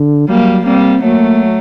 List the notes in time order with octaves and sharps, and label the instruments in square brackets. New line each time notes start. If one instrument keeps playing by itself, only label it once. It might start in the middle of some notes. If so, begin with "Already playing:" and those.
Already playing: [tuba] D3
[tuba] F#3 [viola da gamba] G3 A#3
[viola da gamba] G3 A#3 [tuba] C4
[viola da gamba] F#3 A3 [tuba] A#3